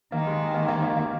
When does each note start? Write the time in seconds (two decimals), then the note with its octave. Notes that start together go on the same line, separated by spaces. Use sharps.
0.12 D#3 A#3
0.27 G#3
0.54 A#3
0.68 A#3
0.83 A#3
0.97 A#3